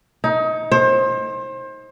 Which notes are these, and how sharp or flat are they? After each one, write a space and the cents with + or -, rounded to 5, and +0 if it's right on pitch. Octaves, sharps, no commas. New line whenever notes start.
D#4 +25
C5 +30